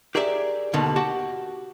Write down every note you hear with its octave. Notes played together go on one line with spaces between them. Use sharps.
G4 G#4 A#4 D5 E5
D#2 B2 D3 D#3
F#4 G4 F#5 A5